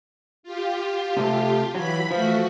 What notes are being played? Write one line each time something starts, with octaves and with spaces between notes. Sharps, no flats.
F4 G4
C3 A3
E3 F#3 B5 B6
F3 A3 F#4